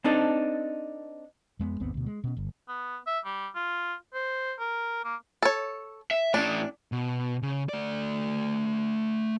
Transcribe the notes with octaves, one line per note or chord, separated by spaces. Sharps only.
C4 D4 D#4 A4
F2 G#3 A3 B3
G#1 D#2 B3 C4
D2 B2
G#3
B2 C#4
G1
B3
E5
G3
F4
C5
A#4
A#3
A4 C#5
E5
A2 C#4 D4
B2
C#3
A3 D5